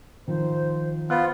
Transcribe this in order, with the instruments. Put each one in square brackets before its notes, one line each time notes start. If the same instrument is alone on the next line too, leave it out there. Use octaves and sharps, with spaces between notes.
[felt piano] D#3 F3 [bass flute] C5
[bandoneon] B3 F4 [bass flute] C5 [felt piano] F#6